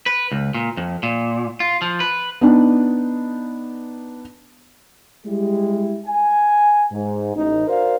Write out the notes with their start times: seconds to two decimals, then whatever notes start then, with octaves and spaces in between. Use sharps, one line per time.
0.06 B4
0.32 C#2
0.54 A#2
0.77 F2
1.03 A#2
1.60 F4
1.82 F3
2.00 B4
2.41 B3 D4 D#4
5.25 G3 G#3 E4 G4
6.06 G#5
6.91 G#2
7.35 A1 D#4
7.67 F#4 A#4 C5 D5 F5